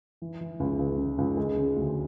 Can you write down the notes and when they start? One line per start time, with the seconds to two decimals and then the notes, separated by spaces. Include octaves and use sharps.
0.22 E3
0.41 E3
0.60 C#2
0.79 C#2
0.98 C#3
1.18 C#2
1.37 G#3
1.57 C#3
1.76 D2